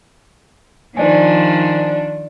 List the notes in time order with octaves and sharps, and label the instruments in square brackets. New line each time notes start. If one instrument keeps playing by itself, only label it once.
[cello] D#3 F3 [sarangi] D4 [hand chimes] C5 D5 G#5